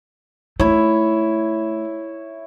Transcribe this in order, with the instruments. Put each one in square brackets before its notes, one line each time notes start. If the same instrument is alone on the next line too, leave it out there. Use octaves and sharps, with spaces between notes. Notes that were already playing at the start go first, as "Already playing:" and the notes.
[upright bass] A3 [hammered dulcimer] E4 C#5